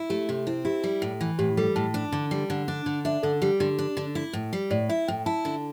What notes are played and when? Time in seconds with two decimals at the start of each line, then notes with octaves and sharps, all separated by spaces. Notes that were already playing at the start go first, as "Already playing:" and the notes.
Already playing: E4
0.10 A3 G4
0.28 C3 G4
0.47 C4 E4
0.65 E4 G4
0.84 G3
1.02 A2
1.21 E3
1.39 A2 G4
1.57 G3 A4
1.76 A2 A5
1.94 D4
2.12 D3
2.31 G3
2.50 D3
2.68 D4
2.86 D3
3.05 D4 E5
3.23 D3 A4
3.42 G3 G4
3.60 D3 G4
3.79 D4
3.97 D3
4.15 E4
4.33 A2
4.53 G3
4.71 A2 D5
4.89 E4 E5
5.08 A2 G5
5.26 E4 A5
5.45 D3